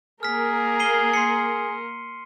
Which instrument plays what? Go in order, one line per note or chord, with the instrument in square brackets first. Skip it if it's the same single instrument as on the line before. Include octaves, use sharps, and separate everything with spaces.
[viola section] A#3 A#4 [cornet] G#4 [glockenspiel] F6 B6
[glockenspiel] C7 D#7 G7
C6 C7 C#7